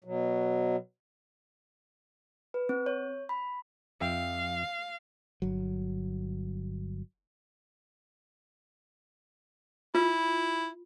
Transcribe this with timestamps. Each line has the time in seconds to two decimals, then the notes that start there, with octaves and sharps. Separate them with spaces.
0.05 B2 F#3
2.54 B4
2.69 C4
2.86 C#5
3.29 B5
4.01 F2 E5 F5 G5
5.42 G1 F#3
9.95 E4 F4